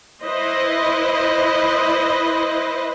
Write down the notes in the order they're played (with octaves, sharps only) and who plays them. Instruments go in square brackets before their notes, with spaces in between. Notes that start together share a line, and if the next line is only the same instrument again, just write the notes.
[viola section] E4 B4 C5 D#5